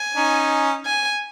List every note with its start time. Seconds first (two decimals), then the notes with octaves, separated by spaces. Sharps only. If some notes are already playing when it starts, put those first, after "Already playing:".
Already playing: G#5
0.16 C#4 D#4
0.85 G#5